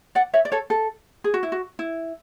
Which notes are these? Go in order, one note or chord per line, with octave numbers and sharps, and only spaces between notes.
D5 F#5
C#5 E5
D5
A4 C#5
A4
G#4
F#4
E4
F#4
E4